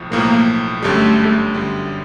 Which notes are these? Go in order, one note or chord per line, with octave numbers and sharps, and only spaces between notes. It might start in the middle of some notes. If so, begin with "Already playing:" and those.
Already playing: B1 A2 F3
B1 A2 F3 A#3
G1 F#2 D3 G3 A3
G1 F#2 D3 G3